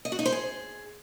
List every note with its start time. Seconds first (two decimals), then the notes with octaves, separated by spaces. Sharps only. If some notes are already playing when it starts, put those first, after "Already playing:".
0.05 D#5
0.12 F#4
0.19 D#4
0.26 C5
0.32 G#4